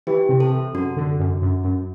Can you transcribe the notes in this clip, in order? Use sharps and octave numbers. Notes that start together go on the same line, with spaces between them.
E3 G4
C3
A4
C3
F#2 F#4
D3
F#2
F#2
F#2